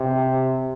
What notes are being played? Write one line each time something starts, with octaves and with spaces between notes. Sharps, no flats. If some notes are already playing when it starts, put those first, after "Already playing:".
Already playing: C3